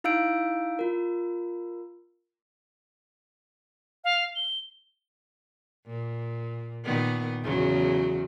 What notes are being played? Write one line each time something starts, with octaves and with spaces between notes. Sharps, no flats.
D#4 E4 F5 E6 G6 D7
F4 A#4
F5
G7
A#2
A#2 D#3 B3
E2 C#3 F#3